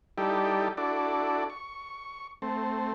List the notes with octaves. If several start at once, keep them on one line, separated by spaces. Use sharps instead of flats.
G3 D#4 E4 G4 A4 D5
D4 E4 F#4 A4 D5
C#6
A3 C4